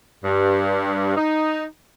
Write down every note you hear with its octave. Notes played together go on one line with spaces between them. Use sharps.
G2
D#4